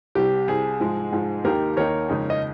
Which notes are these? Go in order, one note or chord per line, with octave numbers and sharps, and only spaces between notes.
C2 C3 G3 G4
C2 C3 G3 G#4
G#2 F3 G#3
G#2 F3 G#3
D#2 D#3 A#3 D#4 G4 A#4
D#2 D#3 A#3 D#4 A#4 C#5
F2 C#3 G#3 D#4
D#5